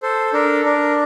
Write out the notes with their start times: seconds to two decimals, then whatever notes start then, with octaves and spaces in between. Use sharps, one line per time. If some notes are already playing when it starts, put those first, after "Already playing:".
0.03 A4 C5
0.33 D4 A#4
0.65 D4 A#4